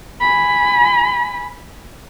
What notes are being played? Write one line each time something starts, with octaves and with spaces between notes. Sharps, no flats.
G#5 B5